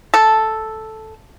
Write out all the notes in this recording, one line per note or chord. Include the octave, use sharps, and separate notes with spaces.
A4